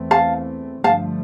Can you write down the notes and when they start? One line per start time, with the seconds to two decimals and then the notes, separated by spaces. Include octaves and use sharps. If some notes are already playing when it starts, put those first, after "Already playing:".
Already playing: E2 E3 A3 C4
0.11 F5 A5
0.84 G2 D3 F3 A3 F5 A5